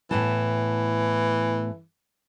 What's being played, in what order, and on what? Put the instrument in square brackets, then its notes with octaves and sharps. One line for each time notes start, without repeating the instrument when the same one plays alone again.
[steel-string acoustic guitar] A2 B3 A5 [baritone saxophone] E3